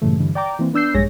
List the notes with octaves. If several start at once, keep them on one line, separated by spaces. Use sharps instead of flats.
G2 A#2 C#3 E3 A3
G2 D3 E3
D5 G5 A#5 D6
E3 A#3 C4
B3 D4 E6 G6 C7
A#1 G2 G#3 G#4 C#5 A#6